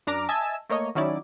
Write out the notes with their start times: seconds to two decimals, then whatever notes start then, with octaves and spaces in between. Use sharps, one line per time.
0.07 F#2 D4 A#5 D6 F6
0.29 D#5 E5 G#5 A5 E6
0.69 A3 A#3 C#5 D#5
0.95 D#3 F#3 C#4 D#4 E4 D5